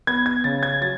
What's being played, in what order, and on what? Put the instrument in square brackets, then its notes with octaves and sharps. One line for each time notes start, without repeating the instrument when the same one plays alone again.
[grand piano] B3 G#6
G#6
C#3 A6
G#6
F#3 A6